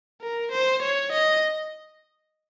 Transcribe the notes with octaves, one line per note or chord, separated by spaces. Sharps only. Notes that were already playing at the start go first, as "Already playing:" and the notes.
A#4
C5
C#5
D#5